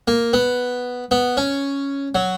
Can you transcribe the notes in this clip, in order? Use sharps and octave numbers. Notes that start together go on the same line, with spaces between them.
A#3
B3
B3
C#4
F#3